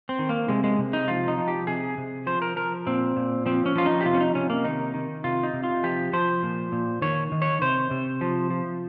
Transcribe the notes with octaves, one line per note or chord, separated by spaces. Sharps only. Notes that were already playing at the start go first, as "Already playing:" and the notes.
C4
D#3
A#3
C3 G#3
G#3
C3
D#4
F3 F4
D#4
F3
G4
C3 G#4
C3
F3 C5
A#4
F3 A#4
A#2 C4
A#2
F3 C4
C#4
F3 F4
D#4
G4
C3 F4
C#4
D#4
C3 C#4
A#3
D#3 D#4
D#3
C3 F4
D#4
C3
F4
F3 G4
F3 C5
A#2
A#2
D#3 C#5
D#3
C#5
C3 C5
C3
F3
F3